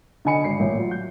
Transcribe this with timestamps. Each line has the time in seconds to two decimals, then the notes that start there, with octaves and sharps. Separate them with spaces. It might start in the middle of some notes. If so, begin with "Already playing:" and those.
0.25 D3 D#4 D#5 G#5 B5 C#7
0.44 G#1 C7
0.59 A1 A#2 E5
0.78 F#3 F4
0.91 G6